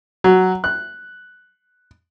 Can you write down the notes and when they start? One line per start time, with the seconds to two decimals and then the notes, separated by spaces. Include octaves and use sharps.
0.24 F#3
0.64 F#6